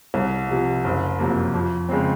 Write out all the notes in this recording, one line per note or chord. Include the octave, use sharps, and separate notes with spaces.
C2
C3 F3
F#1
F2 C3 F#3 A#3
F2
C#3 G#3 C4